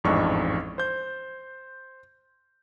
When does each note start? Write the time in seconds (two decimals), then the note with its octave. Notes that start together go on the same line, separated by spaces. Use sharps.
0.04 A1 F2 G#2 D4 C#6
0.78 C5 G6